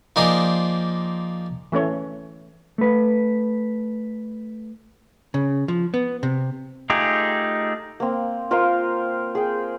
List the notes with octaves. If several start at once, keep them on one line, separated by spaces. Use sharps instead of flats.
F3 A#3 D#4 G#4 C5 D5
E3 A3 C#4 C#5
A3 B4
C#3
F3
B3
C3
A3 D#4 F4 G4 G#4
A#3 C4
F4 A#4 C5 F5
G#4 G5